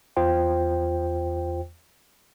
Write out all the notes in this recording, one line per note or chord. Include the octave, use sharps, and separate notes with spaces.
E2 F4 C5 G5